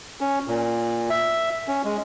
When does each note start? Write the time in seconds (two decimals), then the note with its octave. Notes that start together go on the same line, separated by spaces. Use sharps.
0.21 C#4
0.48 A#2
1.10 E5
1.68 C#4
1.84 G#3